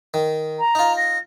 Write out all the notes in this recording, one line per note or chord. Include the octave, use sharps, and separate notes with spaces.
D#3
A#5
D#4 F4
A#6